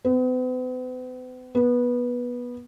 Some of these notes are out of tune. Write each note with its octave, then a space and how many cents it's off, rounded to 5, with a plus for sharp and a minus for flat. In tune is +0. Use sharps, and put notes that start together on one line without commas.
B3 +45
B3 -15